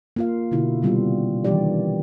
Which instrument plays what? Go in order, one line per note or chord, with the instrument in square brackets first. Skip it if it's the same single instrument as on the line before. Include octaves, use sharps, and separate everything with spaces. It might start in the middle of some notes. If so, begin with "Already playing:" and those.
[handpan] A#3 F4 F5
B2 D3 E4 F#4
C3 D#3 G3 B3 D4 F4
D#3 E3 G3 D4 G4 D5